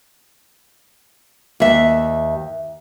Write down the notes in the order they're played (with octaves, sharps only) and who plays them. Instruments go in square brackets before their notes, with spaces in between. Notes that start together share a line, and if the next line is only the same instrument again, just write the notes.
[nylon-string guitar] D#2 E5